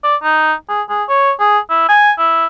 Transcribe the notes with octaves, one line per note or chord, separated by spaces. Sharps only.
D5
D#4
G#4
G#4
C#5
G#4
E4
G#5
E4